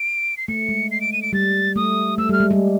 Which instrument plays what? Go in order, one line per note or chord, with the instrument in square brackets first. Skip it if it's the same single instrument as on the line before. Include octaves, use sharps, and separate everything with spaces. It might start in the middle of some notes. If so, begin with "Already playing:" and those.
Already playing: [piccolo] D7
C7
[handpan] A3 [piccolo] C#7
[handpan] G#3
[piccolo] C7
D7
D#7
D7
[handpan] G3 [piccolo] A6
[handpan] A3 [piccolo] D#6
[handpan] A3 [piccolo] E6
[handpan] G3
[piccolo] F6
[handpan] G#3
G3